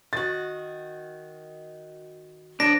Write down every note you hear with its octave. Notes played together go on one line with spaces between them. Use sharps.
D#3 F#4 A6
D3 F3 C4 D4 A#6